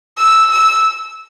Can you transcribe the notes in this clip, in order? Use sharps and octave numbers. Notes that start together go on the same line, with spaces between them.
E6
E6